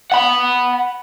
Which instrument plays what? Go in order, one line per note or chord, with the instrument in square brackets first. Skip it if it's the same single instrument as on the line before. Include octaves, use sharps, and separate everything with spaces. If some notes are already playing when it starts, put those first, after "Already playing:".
[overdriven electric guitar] F#5 B5